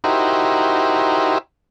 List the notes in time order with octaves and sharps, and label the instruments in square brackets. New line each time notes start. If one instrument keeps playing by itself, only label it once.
[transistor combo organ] D#4 E4 F#4 G4 A#4 C5